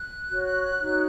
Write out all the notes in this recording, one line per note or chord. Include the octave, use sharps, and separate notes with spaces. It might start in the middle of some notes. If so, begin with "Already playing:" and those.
Already playing: F#6
F#4 C#5
D#4 F#4 C#5